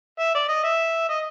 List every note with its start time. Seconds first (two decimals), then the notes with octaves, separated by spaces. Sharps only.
0.19 E5
0.35 D5
0.49 D#5
0.64 E5
1.09 D#5